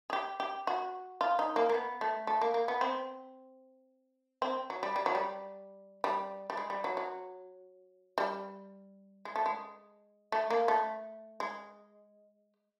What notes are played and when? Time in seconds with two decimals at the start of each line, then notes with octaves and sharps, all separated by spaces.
0.10 G#4
0.13 G4
0.40 G4
0.67 F#4
1.21 F4
1.39 D#4
1.56 A#3
1.69 A#3
1.74 B3
2.01 A3
2.27 A3
2.41 A#3
2.54 A#3
2.68 B3
2.81 C4
4.42 C4
4.70 F#3
4.83 G3
4.96 G3
5.06 F#3
5.15 G3
6.04 G3
6.50 G3
6.57 G#3
6.70 G3
6.84 F#3
6.97 F#3
8.18 G3
9.25 G#3
9.36 A3
9.46 G#3
10.32 A3
10.50 A#3
10.68 A3
11.40 G#3